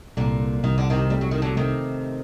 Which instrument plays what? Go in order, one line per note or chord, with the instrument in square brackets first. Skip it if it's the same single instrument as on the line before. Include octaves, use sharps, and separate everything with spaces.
[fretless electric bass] C2 [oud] A#2 D3
[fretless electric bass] C2 [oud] D#3
[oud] D3
C3 D#3
[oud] G3 [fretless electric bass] A3
[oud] F#3
D#3
D3 F#3
[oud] C3 D#3 [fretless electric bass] A3